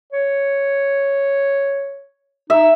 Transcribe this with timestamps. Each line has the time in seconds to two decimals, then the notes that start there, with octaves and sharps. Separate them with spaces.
0.12 C#5
2.50 D#4 E5